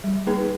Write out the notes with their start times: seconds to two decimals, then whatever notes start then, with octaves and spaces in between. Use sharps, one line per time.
0.04 G3
0.27 A#3 D#4 G#4 B4